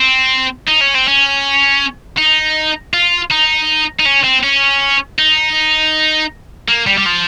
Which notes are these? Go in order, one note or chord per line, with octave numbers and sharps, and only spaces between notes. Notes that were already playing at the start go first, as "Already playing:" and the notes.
Already playing: C4
D#4
C#4
C4
C#4
D#4
F4
D#4
D#4
C#4
C4
C#4
D#4
A#3
G3
G3
F3